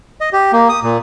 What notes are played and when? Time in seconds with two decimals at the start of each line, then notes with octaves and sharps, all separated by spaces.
0.21 D#5
0.33 G4
0.53 A#3
0.69 D#6
0.83 A#2